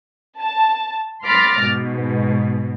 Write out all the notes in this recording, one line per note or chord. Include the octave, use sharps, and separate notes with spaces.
A5
B5 C6 D6 F6 A6 A#6
G#2 B2